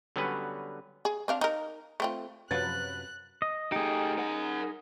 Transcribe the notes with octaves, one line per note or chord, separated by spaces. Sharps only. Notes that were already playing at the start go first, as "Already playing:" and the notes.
D3 F#3 G3 B3 C#4 B4
G#4
C4 D4 F5
D#4 A#4
A3 C4 F4
F#2 C3 F3 F#3 B4 F#6 A6
D#5
A3 D#4 G4 G#4
A#4 F#5